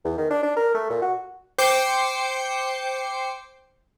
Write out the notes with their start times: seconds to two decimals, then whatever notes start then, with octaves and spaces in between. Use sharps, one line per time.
0.05 E2
0.17 D#3
0.30 D4
0.42 D4
0.56 A#4
0.74 A3
0.90 A#2
1.02 F#4
1.58 C5 G5 D6 G6 C7 C#7